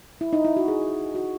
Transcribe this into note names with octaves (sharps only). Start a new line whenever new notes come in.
E4
D#4
E4
F#4
G#4
F#4